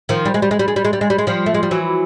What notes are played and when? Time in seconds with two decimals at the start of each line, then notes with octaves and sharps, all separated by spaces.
0.09 D#3 F3
0.25 G3
0.34 G#3
0.42 G3
0.51 G#3
0.59 G3
0.68 G#3
0.76 G3
0.85 G#3
0.93 G3
1.01 G#3
1.10 G3
1.18 G#3
1.27 F3 G3
1.46 A3
1.54 G#3
1.63 G3
1.71 E3 F#3